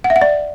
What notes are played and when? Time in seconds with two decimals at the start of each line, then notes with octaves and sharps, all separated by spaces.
0.04 F#5
0.10 E5
0.16 F#5
0.21 D5